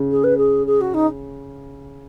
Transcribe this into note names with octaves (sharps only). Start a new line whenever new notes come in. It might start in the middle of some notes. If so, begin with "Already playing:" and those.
Already playing: C#3
G#4
B4
G#4
G#4
F#4
D#4